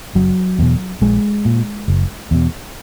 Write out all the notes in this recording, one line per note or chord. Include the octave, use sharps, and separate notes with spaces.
F#1 F#3
E2 B2
A#1 G#3
A#2
F#1
E2 B2